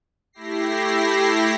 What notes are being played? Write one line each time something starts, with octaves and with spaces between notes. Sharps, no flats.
A3 E4 G4 A#6 C7